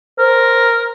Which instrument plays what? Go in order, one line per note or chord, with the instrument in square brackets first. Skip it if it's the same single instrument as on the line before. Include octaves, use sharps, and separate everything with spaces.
[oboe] A#4 [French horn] C5